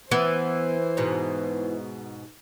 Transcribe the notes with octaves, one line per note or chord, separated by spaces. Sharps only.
E3 B3 C5
G#2 B2